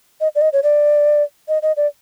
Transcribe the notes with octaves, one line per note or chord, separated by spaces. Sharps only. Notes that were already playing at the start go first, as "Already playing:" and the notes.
D#5
D5
D#5
C#5
D5
D#5
D#5
D5